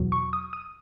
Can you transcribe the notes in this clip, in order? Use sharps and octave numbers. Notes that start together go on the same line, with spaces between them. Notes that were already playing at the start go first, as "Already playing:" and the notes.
Already playing: E2 B2 F#3
C#6
D#6
D#6